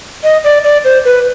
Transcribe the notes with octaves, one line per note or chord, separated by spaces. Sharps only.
D#5
D5
D5
C5
B4